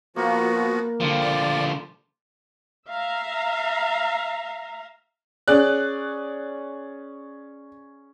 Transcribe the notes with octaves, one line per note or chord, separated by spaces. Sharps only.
F3 A#3 B3 F#4
D3 F3 G3 F4 A4
D5
E5 F5 A#5
C#4 G#4 D5 F#6